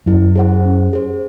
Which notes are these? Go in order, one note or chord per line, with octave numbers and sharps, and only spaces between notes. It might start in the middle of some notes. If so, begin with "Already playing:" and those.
F#2 E4
G#4 C5 F#5
C#4
G#4 C5